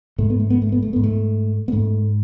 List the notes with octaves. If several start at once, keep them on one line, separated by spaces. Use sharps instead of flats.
G#2 A3
B3
A3
B3
A3
B3
A3
G#2 B3
A3
B3
G#2 A3